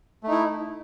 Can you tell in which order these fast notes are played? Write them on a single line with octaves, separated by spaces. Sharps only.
A3 D#4 E4